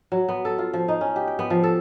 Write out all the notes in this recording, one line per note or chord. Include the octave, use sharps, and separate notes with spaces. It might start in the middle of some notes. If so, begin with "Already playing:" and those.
F#3
B3
A4
F4
F3
D#4
C#4
G4
G5
B3
F3
A4